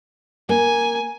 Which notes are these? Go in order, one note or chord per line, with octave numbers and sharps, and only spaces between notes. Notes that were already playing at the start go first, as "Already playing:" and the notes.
A#3 G#5